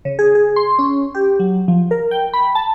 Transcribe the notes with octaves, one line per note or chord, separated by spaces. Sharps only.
C#3
G#4
G#4
C6
C#4
G4
F#3
F3
A#4
G5
B5
A5